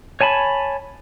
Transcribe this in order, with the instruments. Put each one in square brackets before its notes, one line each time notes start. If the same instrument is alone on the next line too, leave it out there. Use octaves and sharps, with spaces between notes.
[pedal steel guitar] C#5 G#5 A5 B5